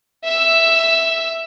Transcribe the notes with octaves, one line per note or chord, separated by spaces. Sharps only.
E5 E6